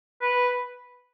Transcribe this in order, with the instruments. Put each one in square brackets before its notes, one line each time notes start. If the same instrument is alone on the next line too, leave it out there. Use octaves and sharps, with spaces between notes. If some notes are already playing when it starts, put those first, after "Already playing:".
[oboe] B4